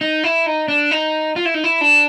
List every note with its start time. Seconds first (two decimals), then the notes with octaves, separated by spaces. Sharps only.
0.01 D#4
0.24 E4
0.46 D#4
0.68 D4
0.91 D#4
1.36 F4
1.45 E4
1.54 D#4
1.64 E4
1.81 D4